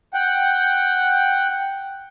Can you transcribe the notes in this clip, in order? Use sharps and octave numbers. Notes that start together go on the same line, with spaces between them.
F#5 G5